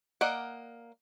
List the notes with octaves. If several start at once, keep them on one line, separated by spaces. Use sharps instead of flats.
A#3 D5 D#5 F#5